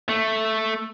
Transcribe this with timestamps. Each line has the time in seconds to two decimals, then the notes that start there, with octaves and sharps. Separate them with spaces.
0.09 A3